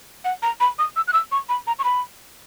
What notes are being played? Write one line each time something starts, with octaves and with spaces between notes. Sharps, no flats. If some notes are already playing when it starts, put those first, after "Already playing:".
F#5
A#5
B5
D#6
E6
F#6
E6
C#6
B5
A#5
C#6
B5